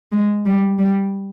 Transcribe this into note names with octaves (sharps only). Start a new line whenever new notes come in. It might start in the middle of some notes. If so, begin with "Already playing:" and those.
G#3
G3
G3